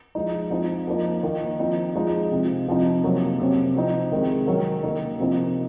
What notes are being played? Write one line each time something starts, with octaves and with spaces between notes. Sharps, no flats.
F3 G#3 D#4
F3 C4 D#4
F3 A#3 D#4
D#3 A#3 D#4
F3 C4 D#4
F3 G#3 D#4
C3 F3 C4
C3 F3 C4 D#4
C3 F#3 A#3
C3 F#3 C4
F3 C4 D#4
C3 D#3 G#3
D#3 F#3 C#4
D#3 A#3 D#4
C3 F3 C4 D#4